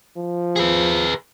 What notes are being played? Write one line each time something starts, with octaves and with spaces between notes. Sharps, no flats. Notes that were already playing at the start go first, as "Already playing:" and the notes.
F3
G#4 B4